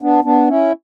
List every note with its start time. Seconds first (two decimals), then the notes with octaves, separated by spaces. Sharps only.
0.01 B3 D4
0.24 B3 D4
0.48 C#4 E4